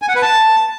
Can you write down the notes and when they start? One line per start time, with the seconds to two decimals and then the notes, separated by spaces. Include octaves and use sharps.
0.02 G#5
0.09 F#5
0.16 B4
0.22 A5